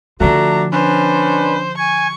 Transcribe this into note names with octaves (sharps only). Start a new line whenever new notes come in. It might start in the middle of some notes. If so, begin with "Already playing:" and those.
D3 F3 A3 D4 F#4 A#5
C#4 D4 B4 C5
G#5 C#6